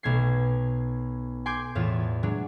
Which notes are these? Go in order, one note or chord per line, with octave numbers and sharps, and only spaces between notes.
B1 A3 G#6 C7
G#5 C6 D6 G6
E2 A2 A3 F4 E7
F#3 G#3 D4